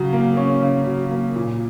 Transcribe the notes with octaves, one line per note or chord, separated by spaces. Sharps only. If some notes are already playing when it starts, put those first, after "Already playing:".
Already playing: C#3 F#3
A#3
C#4
C#3
F#3
A#3
A#2